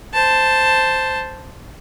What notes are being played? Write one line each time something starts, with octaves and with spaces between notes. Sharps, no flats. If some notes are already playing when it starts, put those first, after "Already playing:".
C5 A5